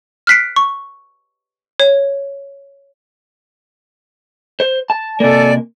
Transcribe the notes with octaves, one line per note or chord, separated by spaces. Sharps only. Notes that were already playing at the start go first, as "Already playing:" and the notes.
F6 F#6 B6 C7 D7
C#6
C#5
C5
A5
C3 A#3 A4 D5 G#5